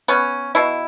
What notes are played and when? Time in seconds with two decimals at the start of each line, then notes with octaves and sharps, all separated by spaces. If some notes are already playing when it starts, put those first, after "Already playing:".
0.08 B3 C#4
0.55 B2 E4